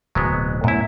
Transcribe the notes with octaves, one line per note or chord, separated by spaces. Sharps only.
D1 B2 F#3 G#3 B3
F#2 A2 A3 B3 E4